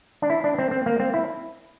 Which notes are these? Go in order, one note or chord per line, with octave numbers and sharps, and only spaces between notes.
D4
E4
D4
C4
C4
A#3
C4
E4